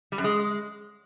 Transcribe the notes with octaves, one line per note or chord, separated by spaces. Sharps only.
G3
F#2
G#3